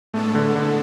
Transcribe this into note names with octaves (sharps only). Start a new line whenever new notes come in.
A2 G#3 A3 B3 D4 A4
D3
D3